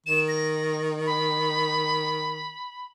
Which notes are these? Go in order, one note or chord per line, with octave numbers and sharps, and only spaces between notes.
D#3 E7
A#6
B5